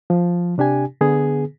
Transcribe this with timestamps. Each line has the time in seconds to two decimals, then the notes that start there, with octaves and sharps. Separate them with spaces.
0.10 F3
0.58 C3 D4 G4 G#5
1.01 D3 B3 G#4